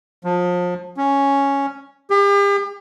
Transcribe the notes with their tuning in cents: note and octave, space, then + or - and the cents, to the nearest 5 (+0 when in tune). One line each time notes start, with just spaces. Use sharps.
F3 +30
C#4 +0
G4 +40